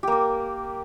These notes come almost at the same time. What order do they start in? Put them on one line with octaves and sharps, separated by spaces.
G4 A#3 A#4